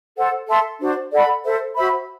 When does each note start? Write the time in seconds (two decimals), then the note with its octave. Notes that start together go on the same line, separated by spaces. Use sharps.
0.17 A4 C5 F#5
0.48 A4 E5 A5 C6
0.80 D4 F#4 C5
1.13 A4 D5 F#5 B5
1.44 A4 C5 E5
1.75 F#4 C5 E5 B5